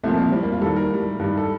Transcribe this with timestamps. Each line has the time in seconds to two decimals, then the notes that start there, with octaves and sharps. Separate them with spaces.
0.03 C2 A#2 F3 A3
0.17 A#3
0.32 A2 G3 C4
0.43 A#3
0.52 F4
0.62 D#2 D#3 G3 A4
0.76 A#4
0.91 A2 G3
1.20 G2 D#3 G3
1.37 A4